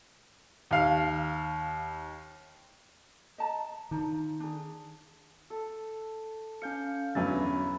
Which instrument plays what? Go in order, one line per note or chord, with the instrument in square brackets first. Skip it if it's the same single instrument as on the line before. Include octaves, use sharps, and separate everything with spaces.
[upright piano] D#2 F5
[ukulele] D#5 A5 A#5
[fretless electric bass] D#3 [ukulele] D4 D#4 F4
[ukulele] D4 G#4
[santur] A4
[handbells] C#4 G6 C#7 [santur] F5
[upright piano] G1 E2 F#3 [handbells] C#4 A6 [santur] E5 G#5 B5